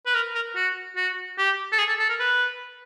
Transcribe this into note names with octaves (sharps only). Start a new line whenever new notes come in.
B4
A#4
A#4
F#4
F#4
G4
A4
G#4
A4
A4
A#4
B4